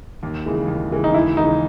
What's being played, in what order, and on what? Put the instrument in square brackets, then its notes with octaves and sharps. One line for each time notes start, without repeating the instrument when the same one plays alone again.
[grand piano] D#2
C#3 E3 G#3
D#2
C#3 E3 G#3
[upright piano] D#4
[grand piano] D#2 [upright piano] E4
[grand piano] C#3 E3 G#3 [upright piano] D#4